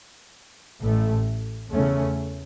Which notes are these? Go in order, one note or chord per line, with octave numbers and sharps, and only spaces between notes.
A1 A2 A3
E2 C#3 A3 C#4